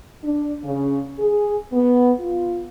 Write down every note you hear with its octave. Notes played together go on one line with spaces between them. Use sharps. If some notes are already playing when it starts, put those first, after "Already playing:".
D4
C#3
G#4
B3
F4